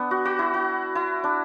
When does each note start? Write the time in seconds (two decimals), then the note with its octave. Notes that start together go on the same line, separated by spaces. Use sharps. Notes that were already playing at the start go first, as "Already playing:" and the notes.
Already playing: B3 D4
0.11 F#4
0.25 F#4
0.39 E4
0.54 F#4
0.95 E4
1.24 D4